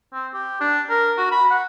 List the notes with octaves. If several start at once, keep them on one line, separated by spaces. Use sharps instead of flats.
C4
G4
D4
A#4
F#4
B5
F#5